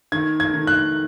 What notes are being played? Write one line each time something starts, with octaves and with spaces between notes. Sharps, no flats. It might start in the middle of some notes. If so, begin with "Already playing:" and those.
D#3 G#6
G#6
D#3
F#6